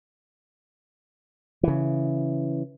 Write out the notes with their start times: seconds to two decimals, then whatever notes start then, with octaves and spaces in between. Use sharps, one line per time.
1.63 C#3 E3